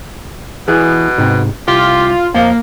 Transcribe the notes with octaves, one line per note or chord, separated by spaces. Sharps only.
B2 E3 G#4
G#2 C3
C2 F4 G4
F2 F3 A#3 F5